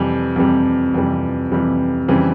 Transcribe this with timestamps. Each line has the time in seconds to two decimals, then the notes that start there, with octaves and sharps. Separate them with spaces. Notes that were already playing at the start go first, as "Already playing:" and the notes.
Already playing: F2 C3 E3 G3
0.36 F2 C3 E3 G3
0.94 F2 C3 E3 G3
1.52 F2 C3 E3 G3
2.08 F2 C#3 E3 G3 C4